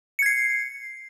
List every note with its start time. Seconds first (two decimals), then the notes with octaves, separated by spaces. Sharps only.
0.19 C#7
0.22 G#6
0.26 C7